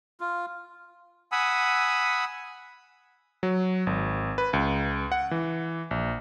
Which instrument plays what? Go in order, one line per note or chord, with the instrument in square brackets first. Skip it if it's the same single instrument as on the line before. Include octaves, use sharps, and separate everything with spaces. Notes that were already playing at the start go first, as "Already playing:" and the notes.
[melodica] F4
[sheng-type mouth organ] F#5 G#5 B5 D#6 E6
[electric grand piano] F#3
G#1
B4
C#2
F#5
E3
A#1